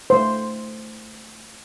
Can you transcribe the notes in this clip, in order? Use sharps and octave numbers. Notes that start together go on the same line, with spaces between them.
A3 C5